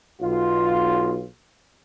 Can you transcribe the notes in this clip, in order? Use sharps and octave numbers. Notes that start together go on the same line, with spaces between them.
B1 F4